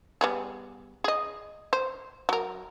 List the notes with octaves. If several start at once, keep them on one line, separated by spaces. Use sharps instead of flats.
G3 B3 G#4
G#4 D#5
C5
F#3 A#4